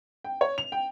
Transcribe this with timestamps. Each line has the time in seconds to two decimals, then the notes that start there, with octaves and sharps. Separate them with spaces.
0.24 G5
0.41 C#5
0.58 F7
0.72 G5